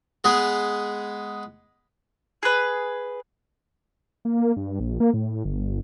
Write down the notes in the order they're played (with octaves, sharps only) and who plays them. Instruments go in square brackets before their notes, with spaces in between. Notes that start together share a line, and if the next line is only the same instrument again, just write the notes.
[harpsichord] G#3 B3 G#4
[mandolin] G#4 B4
[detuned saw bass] A#3
G2
A#1
A#3
A2
G1